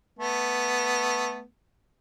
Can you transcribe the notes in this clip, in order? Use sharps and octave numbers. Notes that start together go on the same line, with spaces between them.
A3 B3